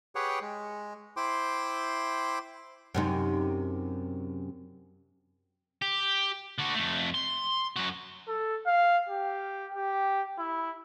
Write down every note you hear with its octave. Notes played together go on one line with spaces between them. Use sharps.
G4 G#4 B4 C#5 F#5 G5
G#3
E4 C5 G5 C6 D6
F#2 C3 D#4
G4
D3 F#4
F2 A3
C6
F#2 F#4
A4
F5
G4
G4
E4